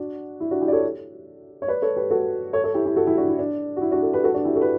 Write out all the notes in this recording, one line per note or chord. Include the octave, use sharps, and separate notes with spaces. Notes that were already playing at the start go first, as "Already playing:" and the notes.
Already playing: D4 F#4
E4
D4 F#4
E4 G4
D5
A4 C#5
C#5
B4 D5
A4 C#5
G4 B4
F#4 A4
A4 C#5
A4 C#5
E4 G4
E4 G4
F#4 A4
E4 G4
D4 F#4
E4
D4
F#4
E4
D4 F#4
F#4 A4
G4 B4
F#4 A4
D4 F#4
E4 G4
F#4 A4
B4